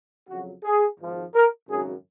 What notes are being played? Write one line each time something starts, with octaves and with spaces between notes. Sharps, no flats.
F2 C#3 F#3 F#4
G#4
G#1 G#2 F3
A#4
G#1 F#2 C#3 F#3 G#4